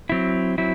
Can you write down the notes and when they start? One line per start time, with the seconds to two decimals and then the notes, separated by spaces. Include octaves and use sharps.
0.10 F#3 C4 E4
0.58 F#3 C4 E4